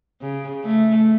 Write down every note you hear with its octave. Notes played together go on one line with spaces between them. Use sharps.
C#3
A3